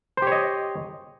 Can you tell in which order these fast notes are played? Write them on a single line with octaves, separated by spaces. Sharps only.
C5 G4 C#5 D#5